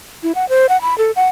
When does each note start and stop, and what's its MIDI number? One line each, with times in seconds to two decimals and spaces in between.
0.23 0.32 64
0.35 0.48 78
0.49 0.67 72
0.69 0.81 78
0.82 0.96 83
0.98 1.11 69
1.16 1.29 78